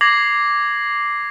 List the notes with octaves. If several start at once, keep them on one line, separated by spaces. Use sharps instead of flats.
D6 G#6 A#6 C7 F#7